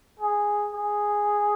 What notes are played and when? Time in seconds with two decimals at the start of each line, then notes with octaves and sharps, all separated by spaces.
0.20 G#4
0.75 G#4